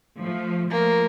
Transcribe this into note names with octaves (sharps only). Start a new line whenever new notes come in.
F3 A3
F3 A3 A#3